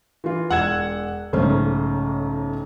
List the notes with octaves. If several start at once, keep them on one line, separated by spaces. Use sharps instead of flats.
E3 F4
E1 F#5 E6 G#6 E7
B1 G#2 C#3 A3 C#4 C5